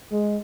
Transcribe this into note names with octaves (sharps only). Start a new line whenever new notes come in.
G#3